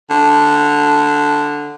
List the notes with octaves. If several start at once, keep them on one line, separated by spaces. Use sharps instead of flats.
D3